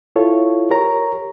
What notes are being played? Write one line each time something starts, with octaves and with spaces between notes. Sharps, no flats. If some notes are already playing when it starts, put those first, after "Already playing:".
E4 F4 A4 C#5
G4 A#4 C#5 A#5